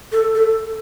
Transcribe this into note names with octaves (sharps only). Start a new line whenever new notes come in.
A4
A4